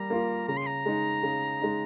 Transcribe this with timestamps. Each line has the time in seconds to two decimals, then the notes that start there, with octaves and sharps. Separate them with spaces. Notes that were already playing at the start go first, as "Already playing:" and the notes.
Already playing: G3 A#3 A#5
0.10 A#3 F4 A#4
0.48 C#3 A#5
0.57 C6
0.66 A#5
0.86 G#3 D#4
1.23 C#3
1.61 G#3 D#4